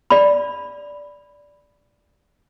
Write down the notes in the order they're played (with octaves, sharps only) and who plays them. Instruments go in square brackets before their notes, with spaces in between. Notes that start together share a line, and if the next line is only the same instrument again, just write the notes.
[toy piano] D5 B5